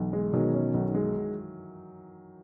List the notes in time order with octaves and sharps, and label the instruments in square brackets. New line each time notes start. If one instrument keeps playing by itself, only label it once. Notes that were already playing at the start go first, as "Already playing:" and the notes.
Already playing: [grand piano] B1 [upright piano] E3
[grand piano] G#3
[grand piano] B2 [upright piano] D#3 F#3
[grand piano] C#4
B1
G#3